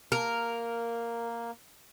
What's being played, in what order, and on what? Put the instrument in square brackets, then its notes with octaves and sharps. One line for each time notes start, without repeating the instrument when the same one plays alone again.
[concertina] A#3 [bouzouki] A#4